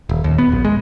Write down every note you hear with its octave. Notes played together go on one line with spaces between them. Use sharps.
D#1
D#2
B3
A#1
G#3